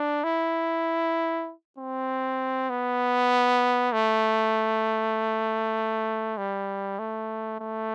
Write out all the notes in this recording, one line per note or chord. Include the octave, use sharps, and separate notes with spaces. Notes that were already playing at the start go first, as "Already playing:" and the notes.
Already playing: D4
E4
C4
B3
A3
G3
A3
A3